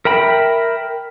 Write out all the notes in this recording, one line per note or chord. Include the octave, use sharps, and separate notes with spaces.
A#4 E5 G5 B5